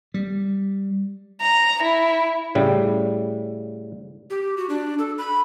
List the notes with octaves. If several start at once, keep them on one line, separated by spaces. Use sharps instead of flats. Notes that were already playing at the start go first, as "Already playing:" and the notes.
G3
A#5
E4
A2 C#3 G3
G4
F#4
D4
A4
B5